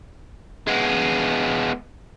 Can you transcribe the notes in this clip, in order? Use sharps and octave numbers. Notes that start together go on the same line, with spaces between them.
G#3 B3